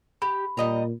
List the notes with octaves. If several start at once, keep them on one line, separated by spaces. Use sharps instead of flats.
G4 B5
A#2 G3 D#5 A#5